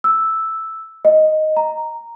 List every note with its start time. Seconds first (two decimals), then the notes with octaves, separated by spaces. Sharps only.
0.04 E6
1.05 D#5
1.57 A#5